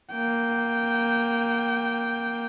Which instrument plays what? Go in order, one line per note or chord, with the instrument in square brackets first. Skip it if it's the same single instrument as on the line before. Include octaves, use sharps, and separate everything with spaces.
[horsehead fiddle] A#3 G5